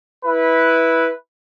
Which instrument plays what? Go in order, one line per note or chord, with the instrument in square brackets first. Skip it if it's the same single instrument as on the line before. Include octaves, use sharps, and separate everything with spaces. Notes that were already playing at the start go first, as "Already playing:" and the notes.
[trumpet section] E4 B4